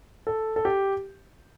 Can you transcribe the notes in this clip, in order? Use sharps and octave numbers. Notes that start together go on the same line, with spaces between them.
A4
A4
G4